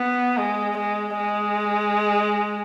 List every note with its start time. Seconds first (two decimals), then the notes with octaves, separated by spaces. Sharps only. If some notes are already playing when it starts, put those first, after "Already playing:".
Already playing: B3
0.37 G#3
0.78 G#3
1.17 G#3